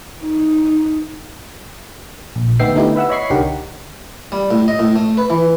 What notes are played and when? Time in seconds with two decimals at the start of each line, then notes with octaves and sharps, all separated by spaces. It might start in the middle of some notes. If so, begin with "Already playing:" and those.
0.23 D#4
2.36 A#1
2.59 D2 B3 D#4 E5 G5 C7
2.74 D3 A3 B3 D#4 E4 G4
2.96 B4 E5 F#5 E6
3.10 C#5 D#5 B5 C#6 C7
3.30 C2 D3 D#4 G4 A#4 F#5
4.32 G3
4.51 A2
4.68 D#5
4.79 A2
4.96 A3
5.17 B4
5.30 E3